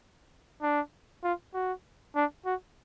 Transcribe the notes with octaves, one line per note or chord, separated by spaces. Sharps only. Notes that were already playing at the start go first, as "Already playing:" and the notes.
D4
F4
F#4
D4
F#4